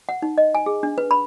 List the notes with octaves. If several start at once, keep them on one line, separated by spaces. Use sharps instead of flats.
F#5
D#4
D#5
G#5
G#4
D4
B4
B5